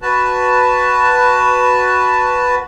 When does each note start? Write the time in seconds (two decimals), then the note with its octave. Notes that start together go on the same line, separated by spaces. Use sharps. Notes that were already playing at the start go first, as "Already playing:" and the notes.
0.02 F#4 B4 A5